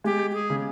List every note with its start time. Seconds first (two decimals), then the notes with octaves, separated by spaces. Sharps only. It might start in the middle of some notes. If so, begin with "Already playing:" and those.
0.04 G#3 G4
0.31 G4
0.34 G#4
0.50 C#3